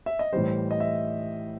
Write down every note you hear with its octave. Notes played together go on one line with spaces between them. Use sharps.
E5
D#5
A2 E3 G3 C5
D#5
E5